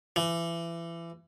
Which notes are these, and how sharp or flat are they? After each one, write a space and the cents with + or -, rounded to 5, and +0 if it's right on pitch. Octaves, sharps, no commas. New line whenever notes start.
E3 +30